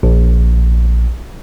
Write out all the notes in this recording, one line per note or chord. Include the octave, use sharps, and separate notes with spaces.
A#1